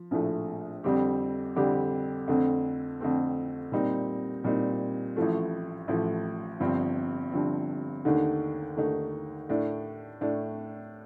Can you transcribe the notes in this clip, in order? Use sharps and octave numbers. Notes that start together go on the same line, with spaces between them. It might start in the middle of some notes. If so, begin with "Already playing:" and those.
Already playing: F3
A#1 A2 F3 A3
F2 D3 G3 C4 G4
F2 D3 G3 C4 G4
F2 D3 A3 C4
F2 D3 A3 C4
A#2 G3 C4 D#4
A#2 G3 C4 D#4
A1 A2 F3 A3
A1 A2 F3 A3
G1 G2 F3 C4
G1 G2 F3 C4
D#2 D3 A3 D#4
D#2 D3 A3 D#4
A2 A3 D4
A2 A3 D4